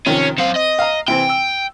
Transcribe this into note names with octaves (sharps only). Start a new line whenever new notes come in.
C3 D#3 F3 C#4
F#2 C4 F5
D#5
F5 A#5
C3 E3 C4 G5
E6